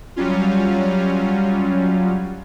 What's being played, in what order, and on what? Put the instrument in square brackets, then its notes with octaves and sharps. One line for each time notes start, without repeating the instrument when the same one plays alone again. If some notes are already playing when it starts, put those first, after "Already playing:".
[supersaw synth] F#3 G3 C#4 F4